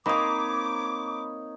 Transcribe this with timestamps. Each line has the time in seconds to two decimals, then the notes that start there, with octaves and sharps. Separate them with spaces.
0.06 A#3 C4 D#4 C#5 B5 D6 D#6